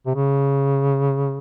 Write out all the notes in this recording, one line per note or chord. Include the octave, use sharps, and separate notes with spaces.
C3
C#3